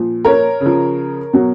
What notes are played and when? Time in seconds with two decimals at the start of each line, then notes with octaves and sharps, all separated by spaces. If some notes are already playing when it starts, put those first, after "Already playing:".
Already playing: A#2 F3
0.25 A#4 C#5
0.60 C#3
0.66 F3
1.33 B2 F#3